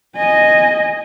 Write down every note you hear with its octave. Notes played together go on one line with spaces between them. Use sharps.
D#5 G#5